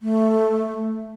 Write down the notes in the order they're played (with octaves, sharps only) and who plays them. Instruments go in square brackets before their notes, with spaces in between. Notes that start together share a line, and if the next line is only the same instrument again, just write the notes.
[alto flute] A3